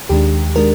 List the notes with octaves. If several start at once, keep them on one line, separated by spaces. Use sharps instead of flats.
D#2 D#3 G#3 D4 G4
D#3 G#3 D4 A#4